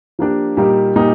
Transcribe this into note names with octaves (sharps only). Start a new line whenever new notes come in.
F3 A#3 D4 G4
A#2 G3 A#3 D#4 G4
A#2 G3 A#3 D#4 G4